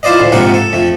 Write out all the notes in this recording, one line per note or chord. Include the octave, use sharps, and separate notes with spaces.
E4 F4 C5 D5 D#5
D2 A2
G#2 C3 A#3 D#4 F4 F#5
A4
F2 A3